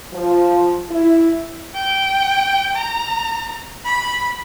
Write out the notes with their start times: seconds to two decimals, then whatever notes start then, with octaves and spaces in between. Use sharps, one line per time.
0.13 F3
0.89 E4
1.74 G5
2.76 A#5
3.85 B5